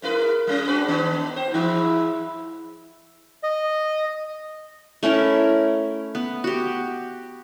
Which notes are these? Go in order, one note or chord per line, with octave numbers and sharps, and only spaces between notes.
G#2 E4 A#4 B4
G3 C#4
C4 D4 F#4 B4
D#3 B3 D#4
C5 G5
G#2 E3 E4
D#5
A3 C#4 E4 A#4
B3
F#4 G4